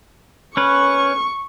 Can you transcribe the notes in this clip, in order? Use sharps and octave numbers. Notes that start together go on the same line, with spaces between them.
C#4 B4 C#6